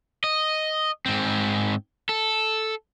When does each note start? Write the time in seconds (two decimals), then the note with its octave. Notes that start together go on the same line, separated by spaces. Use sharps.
0.24 D#5
1.06 G#2 C4
2.09 A4